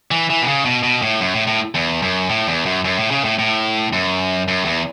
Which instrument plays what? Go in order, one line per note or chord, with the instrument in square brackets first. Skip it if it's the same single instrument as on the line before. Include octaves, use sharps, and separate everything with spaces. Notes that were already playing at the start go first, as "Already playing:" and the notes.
[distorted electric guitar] E3
E3
B2
C#3
B2
B2
A2
F#2
A2
A2
E2
F#2
A2
E2
F#2
F#2
A2
C#3
A2
A2
F#2
F#2
E2